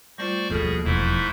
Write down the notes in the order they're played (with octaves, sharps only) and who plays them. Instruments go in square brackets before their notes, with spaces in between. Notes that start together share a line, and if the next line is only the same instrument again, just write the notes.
[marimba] G3 A3 F4 [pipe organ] C5 D5 C#6
[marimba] D#2 A4 F6 [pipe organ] B2 G#4 [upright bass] F3 A#3
[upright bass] E1 F3 [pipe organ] G#2 A3 E4